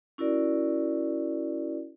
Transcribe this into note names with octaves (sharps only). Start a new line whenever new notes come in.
C#4 E4 F#4 A#4 D5